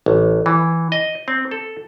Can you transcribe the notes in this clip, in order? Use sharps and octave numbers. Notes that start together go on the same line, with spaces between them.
A1
E3
D#5
C4
A4